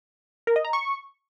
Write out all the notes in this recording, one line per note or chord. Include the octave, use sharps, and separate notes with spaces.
A#4
D#5
A#5
C#6